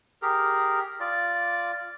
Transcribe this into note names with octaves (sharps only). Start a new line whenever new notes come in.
G4 G#4 A#4
F4 D5